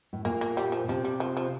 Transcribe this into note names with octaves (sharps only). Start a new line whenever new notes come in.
A2
A#2 A#3
A#3
G3
F3
C3 F3
G3
F3
F3